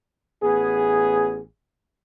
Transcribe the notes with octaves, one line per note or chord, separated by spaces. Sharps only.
A1 B3 G#4